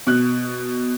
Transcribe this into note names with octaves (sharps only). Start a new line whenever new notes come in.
B2 F#6